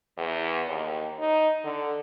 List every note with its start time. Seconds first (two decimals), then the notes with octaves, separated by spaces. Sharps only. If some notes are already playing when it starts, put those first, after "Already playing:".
0.17 E2
0.67 D#2
1.19 D#4
1.65 D3